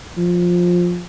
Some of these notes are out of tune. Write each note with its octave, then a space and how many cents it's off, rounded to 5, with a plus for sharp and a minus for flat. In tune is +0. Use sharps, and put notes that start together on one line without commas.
F3 +15